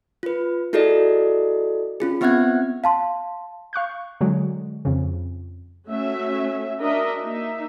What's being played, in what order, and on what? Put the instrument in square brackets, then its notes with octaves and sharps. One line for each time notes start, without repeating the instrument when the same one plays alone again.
[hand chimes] F4 B4
E4 F#4 G#4 A4 D5 D#5
C#4 F4 G#4
B3 C4 E5 F#5 F#6 G#6
[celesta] F5 A5 C6
[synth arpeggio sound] F5 C#6 F#6 G6
D3 F#3 G#3
F2 C#3
[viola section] A3 C#4 F#4 E5
D4 F#4 A#4 D#5 E5
A#3 D#4 E5